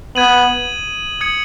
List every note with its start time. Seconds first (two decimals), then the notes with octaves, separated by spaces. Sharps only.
0.15 B3 D#6 G#6 D#7 F#7
1.21 D#6 G#6 C#7 F#7